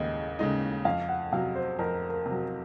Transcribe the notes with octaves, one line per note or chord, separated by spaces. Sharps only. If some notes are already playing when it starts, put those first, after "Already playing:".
Already playing: D#2 C#3 G#3 G#4 D#5
C#3 G#3 D#4
F2 F5
F#5
C3 F#3 F5
C5
F2 A#4
A#4
C3
F#3